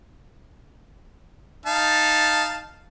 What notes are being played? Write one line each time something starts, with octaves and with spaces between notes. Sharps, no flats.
D#4 F5 A5